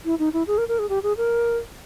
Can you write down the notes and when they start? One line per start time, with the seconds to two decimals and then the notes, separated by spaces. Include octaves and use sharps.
0.05 E4
0.19 D#4
0.33 E4
0.47 G#4
0.58 A#4
0.68 A#4
0.79 G#4
0.89 G4
1.03 G#4
1.17 A#4